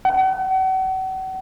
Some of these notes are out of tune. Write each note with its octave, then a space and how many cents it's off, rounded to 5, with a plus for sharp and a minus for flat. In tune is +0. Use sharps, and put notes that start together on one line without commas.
F#5 +40